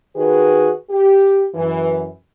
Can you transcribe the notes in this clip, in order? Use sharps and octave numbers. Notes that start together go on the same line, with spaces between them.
D#3 F#4 G#4 B4
G4
F#2 E3